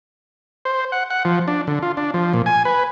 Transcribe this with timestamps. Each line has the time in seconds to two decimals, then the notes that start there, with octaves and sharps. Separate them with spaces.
0.65 C5
0.92 F#5
1.10 F#5
1.25 F3
1.48 D4
1.67 D3
1.83 F4
1.97 D4
2.14 F3
2.33 A#2
2.46 G#5
2.65 B4